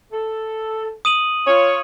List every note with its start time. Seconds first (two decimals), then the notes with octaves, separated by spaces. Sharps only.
0.12 A4
1.05 D#6 D#7 F#7
1.47 F4 C#5